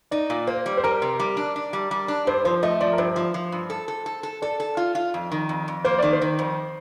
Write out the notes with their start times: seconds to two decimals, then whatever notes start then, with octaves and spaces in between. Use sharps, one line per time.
0.11 D#4 D5
0.30 A#2
0.47 A#3 C5
0.66 G3
0.77 C5
0.84 G3 A#4
1.02 C3
1.20 G3
1.37 D4
1.56 D4
1.73 G3
1.91 G3
2.08 D4
2.27 G2 C5
2.45 F3 C5
2.63 A3 D#5
2.81 F3 D5
2.92 A#4
2.98 G2 C5
3.16 F3
3.34 F3
3.52 G2
3.70 A4
3.88 A4
4.06 A4
4.23 A4
4.42 A4 D5
4.60 A4
4.77 F4
4.95 F4
5.14 F2
5.32 D#3
5.49 F2
5.68 F2
5.85 A#3 C5
5.99 D#3 D5
6.13 C5
6.22 D#3
6.39 F2